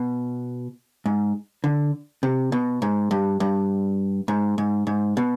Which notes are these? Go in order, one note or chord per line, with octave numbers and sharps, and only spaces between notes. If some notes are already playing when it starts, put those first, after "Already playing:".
Already playing: B2
G#2
D3
C3
B2
G#2
G2
G2
G#2
G#2
G#2
B2